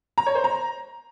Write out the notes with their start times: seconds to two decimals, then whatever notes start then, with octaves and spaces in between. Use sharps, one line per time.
0.18 A#5
0.26 C#5
0.35 C5
0.44 A#5